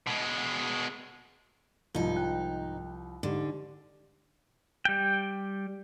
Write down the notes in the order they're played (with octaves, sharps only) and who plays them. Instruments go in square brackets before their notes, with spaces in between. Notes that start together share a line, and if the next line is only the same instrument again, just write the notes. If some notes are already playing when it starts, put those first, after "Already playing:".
[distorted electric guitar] B2 G#3
[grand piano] C2 F3 [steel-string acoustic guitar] G#2 D#4 [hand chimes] F4
[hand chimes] G5 F#6
[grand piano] G#2 [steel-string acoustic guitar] D3 [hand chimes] D#4 G4
[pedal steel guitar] G3 G5